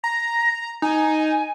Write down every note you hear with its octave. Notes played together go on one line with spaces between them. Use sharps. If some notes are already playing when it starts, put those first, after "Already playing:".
A#5 A#6
D#4 G#5